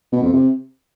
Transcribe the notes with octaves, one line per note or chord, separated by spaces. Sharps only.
B2
F2
C3